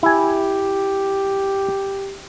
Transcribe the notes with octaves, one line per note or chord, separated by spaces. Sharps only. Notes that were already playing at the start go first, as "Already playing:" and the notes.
E4 G4 G#5